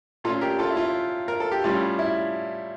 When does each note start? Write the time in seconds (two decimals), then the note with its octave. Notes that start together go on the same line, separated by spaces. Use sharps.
0.24 A#2 A3 C#4 F4 A4
0.41 G4 A#4
0.59 F4 A4
0.70 E4
0.77 F4
1.28 A#4
1.40 A4
1.52 G4
1.64 A2 G3 C#4 F4
1.99 E4